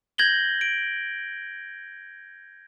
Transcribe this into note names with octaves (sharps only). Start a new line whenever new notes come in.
G6 G#6 A#6 F#7 G7
D7